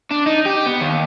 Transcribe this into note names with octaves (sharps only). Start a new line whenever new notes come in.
D4
D#4
G4
B3
D#2